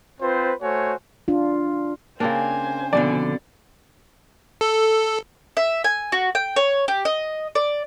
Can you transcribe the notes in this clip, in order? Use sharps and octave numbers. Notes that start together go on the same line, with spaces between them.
C4 F4 B4 C5
A3 F#4 C5 C#5 G#5
D4 F4
C#3 A#3 C4 D4 C5 G#5
F2 B2 D3 D5
A4
E5
G#5
F#4
G5
C#5
G4
D#5
D5